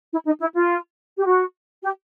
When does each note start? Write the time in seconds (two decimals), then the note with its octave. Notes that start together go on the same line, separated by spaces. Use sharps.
0.12 E4
0.26 D#4
0.40 E4
0.54 F4
1.17 G4
1.25 F#4
1.82 G4